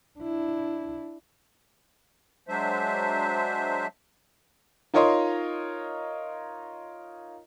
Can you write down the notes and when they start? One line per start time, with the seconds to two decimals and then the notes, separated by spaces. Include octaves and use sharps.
0.19 D4 E4
2.48 F#3 G#3 D4 C5 E5
4.94 D#4 F4 A#4 C#5 D#5 C6